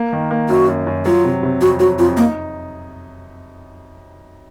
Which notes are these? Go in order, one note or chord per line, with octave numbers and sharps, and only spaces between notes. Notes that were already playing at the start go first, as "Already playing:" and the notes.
Already playing: A#3
D#3
A#3
F#2 F#4
F#2
F#2
F#3 F4
C3
C3
F2 F#4
F#3 F#4
F2 F4
A#3 D#4